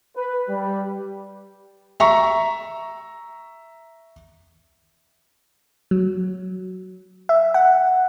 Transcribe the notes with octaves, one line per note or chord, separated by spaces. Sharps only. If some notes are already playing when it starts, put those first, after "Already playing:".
B4
G3
E5 A#5 C#6
F#3
E5
F#5